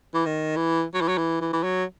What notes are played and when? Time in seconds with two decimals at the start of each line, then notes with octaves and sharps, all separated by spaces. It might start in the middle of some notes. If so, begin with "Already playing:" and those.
0.14 E3
0.26 D#3
0.56 E3
0.94 F#3
1.01 E3
1.08 F#3
1.18 E3
1.41 E3
1.53 E3
1.63 F#3